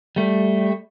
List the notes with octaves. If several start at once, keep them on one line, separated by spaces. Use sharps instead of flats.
G3 A3